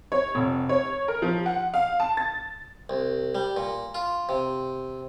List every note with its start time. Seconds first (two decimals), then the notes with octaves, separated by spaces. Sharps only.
0.12 C#5
0.35 F1
0.69 C#5
1.08 A#4
1.22 F3
1.46 F#5
1.74 F5
2.00 A5
2.17 A6
2.90 C2
3.35 G3
3.57 A#2
3.95 F4
4.29 C3